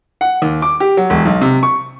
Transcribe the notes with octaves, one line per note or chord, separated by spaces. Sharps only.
F#5
D#2
D6
G4
F#3
E1
B1
C3
C#6